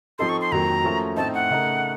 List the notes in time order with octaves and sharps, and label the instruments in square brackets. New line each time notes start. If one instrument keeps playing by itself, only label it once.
[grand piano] F3 C4 D#4 A4 [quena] C6
[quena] C#6
C6
[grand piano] F2 D#3 F#3 A#3 [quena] A#5
[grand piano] F3 A3 C#4 F#4 A#4
[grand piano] A2 A3 C4 D#4 [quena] A5
[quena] F#5
[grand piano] C#3 A3 D#4 A#4